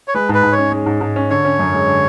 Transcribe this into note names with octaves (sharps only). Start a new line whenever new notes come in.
C#5
G#3 B4
G#2
B4
G#2
C#5
C#4
G#3
G#2
G#2
C#4
D3 C#5
C#4
F#2
G#3
D3